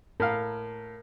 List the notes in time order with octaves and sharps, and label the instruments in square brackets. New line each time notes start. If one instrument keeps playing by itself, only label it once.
[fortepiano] A2 F5 [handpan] A#4